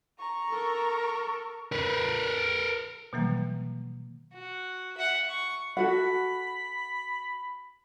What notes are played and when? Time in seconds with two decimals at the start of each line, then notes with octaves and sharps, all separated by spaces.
0.20 A#5 C#6
0.50 A4 A#4
1.72 A#4 B4
3.13 B2 D#3 E3 F#3 G3 A#3
4.34 F#4
4.98 E5 F#5
5.29 C#6
5.77 F#4 A4 F#5 B5